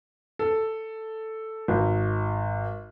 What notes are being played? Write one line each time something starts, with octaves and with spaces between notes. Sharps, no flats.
A4
G#1